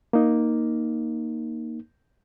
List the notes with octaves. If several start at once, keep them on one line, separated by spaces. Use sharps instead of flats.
A#3 D#4